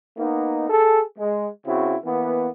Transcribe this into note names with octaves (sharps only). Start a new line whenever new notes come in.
A#3 B3 D#4
G#4 A4
G#3
C#3 C4 E4 F#4
E3 A#3 B3